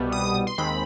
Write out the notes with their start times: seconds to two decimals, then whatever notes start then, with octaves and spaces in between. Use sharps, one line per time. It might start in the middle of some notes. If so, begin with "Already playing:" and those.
Already playing: C2 B2 G3 B3
0.12 D#6
0.47 C6
0.58 D#2 D#3 G#3 C4 B5